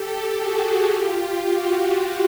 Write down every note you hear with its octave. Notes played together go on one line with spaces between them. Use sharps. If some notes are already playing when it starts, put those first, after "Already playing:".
Already playing: G4 A4
F#4 G#4
F4 G4
F#4